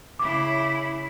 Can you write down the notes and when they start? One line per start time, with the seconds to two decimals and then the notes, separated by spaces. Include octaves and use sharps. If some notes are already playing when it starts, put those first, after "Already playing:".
0.19 C#3 E4 D6